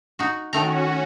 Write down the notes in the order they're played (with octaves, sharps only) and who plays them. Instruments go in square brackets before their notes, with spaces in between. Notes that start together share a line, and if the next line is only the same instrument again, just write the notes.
[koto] D#4 F#4
[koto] D#3 A3 A#5 [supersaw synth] C#4 F#4